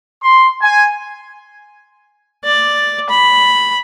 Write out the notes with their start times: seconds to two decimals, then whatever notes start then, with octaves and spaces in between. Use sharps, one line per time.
0.21 C6
0.61 G#5
2.44 D5
3.09 B5